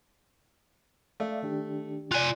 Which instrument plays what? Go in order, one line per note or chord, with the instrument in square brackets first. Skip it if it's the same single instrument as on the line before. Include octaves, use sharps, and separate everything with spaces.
[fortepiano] A3 [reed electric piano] D5 E5 F5
[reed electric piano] D#3 D4 G4
[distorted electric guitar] F4 G#5 [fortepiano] D5 F#6